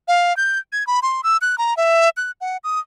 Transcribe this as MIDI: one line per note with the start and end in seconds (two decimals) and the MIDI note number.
0.08 0.36 77
0.37 0.59 91
0.72 0.86 92
0.87 1.00 83
1.02 1.21 84
1.24 1.37 88
1.41 1.58 90
1.58 1.76 82
1.77 2.09 76
2.17 2.31 90
2.41 2.57 78
2.64 2.79 87